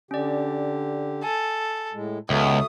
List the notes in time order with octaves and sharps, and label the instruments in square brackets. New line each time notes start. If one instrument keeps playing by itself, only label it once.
[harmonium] D3 G4 [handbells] C#4 D5
[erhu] A4 [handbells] G#5
[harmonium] A2 G#3
[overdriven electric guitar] C#2 [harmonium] B3 [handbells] F#4 A4 E5 [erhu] D#6